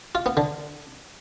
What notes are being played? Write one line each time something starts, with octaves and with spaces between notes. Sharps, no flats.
F4
B3
D3